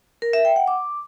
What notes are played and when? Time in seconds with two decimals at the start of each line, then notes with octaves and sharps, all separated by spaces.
0.22 A#4
0.33 E5
0.45 G5
0.56 F#5
0.68 D6